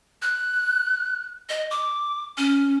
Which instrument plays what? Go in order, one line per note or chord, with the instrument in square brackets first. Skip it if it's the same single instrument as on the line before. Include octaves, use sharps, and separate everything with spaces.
[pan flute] F#6
D#5
D6
C#4